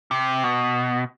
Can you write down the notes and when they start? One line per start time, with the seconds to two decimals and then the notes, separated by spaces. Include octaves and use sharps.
0.11 C3
0.44 B2